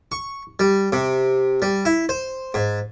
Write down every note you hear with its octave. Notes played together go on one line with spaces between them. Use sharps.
C#6
G3
C3
G3
E4
C5
G#2